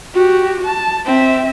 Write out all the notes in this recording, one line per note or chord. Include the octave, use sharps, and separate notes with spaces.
F#4 G4
A5
C4 E5